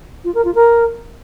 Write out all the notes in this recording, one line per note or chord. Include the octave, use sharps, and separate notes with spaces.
F4
A#4
F4
A#4